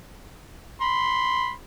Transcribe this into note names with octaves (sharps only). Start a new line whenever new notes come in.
B5 C6